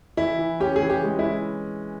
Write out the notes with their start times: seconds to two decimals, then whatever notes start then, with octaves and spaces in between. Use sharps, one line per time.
0.17 E3 E4
0.39 E3
0.60 C#4 G4
0.76 G#4
0.82 E3
0.90 G4
1.05 G#3
1.19 E4